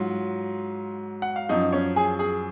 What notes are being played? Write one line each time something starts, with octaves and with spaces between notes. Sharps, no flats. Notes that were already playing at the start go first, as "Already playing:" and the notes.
Already playing: G#2 F#3 F4
F#5
F5
F#2 F3 D#4 D#5
C#4 C#5
G#4 G#5
G#4 G#5